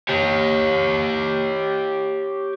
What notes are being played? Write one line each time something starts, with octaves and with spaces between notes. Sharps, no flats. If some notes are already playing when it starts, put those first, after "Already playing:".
G4 C#5